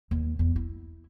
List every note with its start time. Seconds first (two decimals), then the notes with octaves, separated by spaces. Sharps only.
0.11 D#2
0.39 E2
0.56 E4